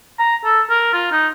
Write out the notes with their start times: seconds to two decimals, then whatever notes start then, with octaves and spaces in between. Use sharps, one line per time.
0.19 A#5
0.45 A4
0.70 A#4
0.93 F4
1.12 D#4